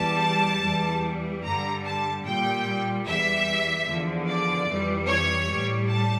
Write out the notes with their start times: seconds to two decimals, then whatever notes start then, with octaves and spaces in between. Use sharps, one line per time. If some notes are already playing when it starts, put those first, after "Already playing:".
Already playing: E2 E3 G3 A5
0.64 E2 E3 G3
1.45 G2 D3 G3 A#5
1.85 A5
2.25 A#2 G3 G5
3.06 E2 E3 G3 E5
3.87 E2 D3 F3
4.27 D5
4.68 F2 E3 G3
5.07 C#5
5.48 A2 G3
5.88 A5